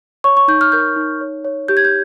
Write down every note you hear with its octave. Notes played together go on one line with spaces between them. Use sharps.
C#5 C#6
C#6
D#4 G6
F6
A#4 G6
D#4
C#5
C#5
G4 G6
G#6
G6